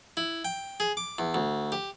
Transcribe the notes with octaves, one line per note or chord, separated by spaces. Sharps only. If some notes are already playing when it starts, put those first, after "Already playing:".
E4
G5
G#4
D6
E2
D2
G4